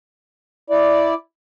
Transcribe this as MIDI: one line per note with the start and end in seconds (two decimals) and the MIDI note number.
0.70 1.14 64
0.70 1.14 74